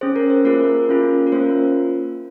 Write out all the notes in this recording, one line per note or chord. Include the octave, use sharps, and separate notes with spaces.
C#4 G#4 C5
A#4
C5
A#3 F4 G#4 A#4
C#4 F4 G#4
A#4
A#3 C#4 F4 C5